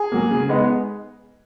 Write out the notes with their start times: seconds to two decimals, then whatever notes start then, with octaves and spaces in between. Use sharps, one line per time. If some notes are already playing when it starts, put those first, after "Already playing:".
Already playing: G#4
0.12 F#3 A#3
0.31 C#3
0.49 G#3 B3 D#4